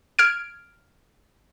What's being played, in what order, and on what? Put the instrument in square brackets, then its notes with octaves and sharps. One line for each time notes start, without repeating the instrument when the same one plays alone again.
[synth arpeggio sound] F6 G#6 D7